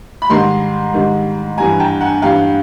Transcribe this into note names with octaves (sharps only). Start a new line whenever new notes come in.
B5
G#2 D#3 G3 A#5 C6
G#2 D#3 G3
G2 E3 G3 G#5 A#5
G5 A5
F#5 G#5
G2 E3 G3 F5 G5